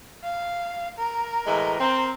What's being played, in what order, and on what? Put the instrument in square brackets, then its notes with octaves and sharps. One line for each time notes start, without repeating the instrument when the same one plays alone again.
[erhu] F5
A#4
[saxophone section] A2 E3 G#3
C4